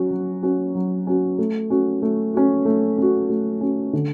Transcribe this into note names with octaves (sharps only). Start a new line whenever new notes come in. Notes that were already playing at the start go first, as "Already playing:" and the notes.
Already playing: F#3 C#4 F#4
F#3
C#4 F#4
F#3
C#4 F#4
A3
C#4 F#4
A3
C#4 F#4
A3
C#4 F#4
A3
C#4 F#4
D3